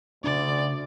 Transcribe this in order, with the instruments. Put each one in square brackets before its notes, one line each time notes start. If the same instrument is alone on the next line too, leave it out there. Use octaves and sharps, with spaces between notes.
[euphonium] D2 [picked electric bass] C#3 D4 [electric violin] D5